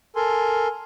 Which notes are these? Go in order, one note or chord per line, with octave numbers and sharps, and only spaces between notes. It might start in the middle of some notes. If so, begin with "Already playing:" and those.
A4 A#4 G#5 C6